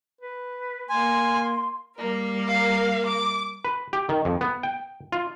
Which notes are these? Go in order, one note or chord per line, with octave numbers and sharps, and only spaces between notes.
B4
A#3 G#5 C6
G3 A#3 A#4
F5
D6
B4
G4
D#3
F2
B3
G5
F4